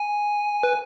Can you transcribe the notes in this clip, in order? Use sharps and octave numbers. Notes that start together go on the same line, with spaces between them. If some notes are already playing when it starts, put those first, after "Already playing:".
Already playing: G#5
B4